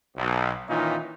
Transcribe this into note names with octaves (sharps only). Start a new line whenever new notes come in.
B1
A#2 D#3 E3 C#4 D#4 F4